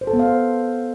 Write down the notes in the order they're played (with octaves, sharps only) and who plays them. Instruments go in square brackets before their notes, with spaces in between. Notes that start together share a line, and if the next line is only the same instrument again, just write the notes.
[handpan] C5
A4
B3
F5
C5